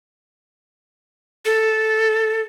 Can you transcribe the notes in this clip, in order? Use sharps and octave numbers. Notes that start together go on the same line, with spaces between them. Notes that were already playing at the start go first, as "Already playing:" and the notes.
A4